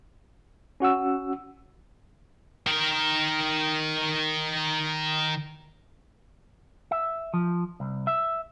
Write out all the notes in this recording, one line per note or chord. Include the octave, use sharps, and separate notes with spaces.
C#4 F#4 F#5 E6
D#3 A#4
E5
F3
C2
E5